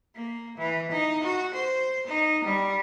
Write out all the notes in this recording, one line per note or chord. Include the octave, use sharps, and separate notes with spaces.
A#3
E3
D#4
F#4
C5
D#4
G3